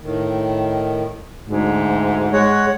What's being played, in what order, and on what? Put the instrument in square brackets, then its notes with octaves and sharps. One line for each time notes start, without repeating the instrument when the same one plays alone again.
[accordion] A2 D#3
[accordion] D2 [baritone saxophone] G#2
[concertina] G#3 C#5 [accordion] F#5